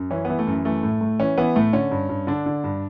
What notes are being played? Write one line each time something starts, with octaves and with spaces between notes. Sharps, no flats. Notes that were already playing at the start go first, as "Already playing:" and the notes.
Already playing: F#2
E3 C#4
E3 B3
A3
F#2
E3 A3
A2
A2
E3 C#4
E3 B3
A2 A3
D3 C#4
G2
G2
D3 D4
D3
G2